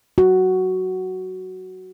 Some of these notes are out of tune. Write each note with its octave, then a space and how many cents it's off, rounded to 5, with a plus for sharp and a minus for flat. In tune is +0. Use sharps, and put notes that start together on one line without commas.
F#4 +5